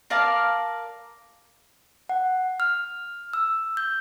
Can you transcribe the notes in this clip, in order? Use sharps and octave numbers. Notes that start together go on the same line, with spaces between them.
A#4 D5 F5 A5
F#5
F6
E6
G6